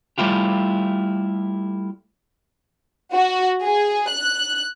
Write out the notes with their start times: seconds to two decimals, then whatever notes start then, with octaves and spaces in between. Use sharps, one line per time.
0.18 G3 A3 E4 F4 G4
3.13 F#4
3.63 G#4
4.09 F#6